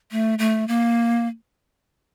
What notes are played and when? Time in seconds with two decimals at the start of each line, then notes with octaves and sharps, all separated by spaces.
0.11 A3
0.39 A3
0.68 A#3